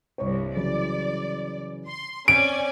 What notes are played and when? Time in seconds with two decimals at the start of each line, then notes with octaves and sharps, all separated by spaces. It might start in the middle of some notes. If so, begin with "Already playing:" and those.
0.18 C2 G2 C#5 C#6
0.56 C#3 E3 F#3 D5
1.87 C6
2.28 C4 C#4 D5 G#5 D7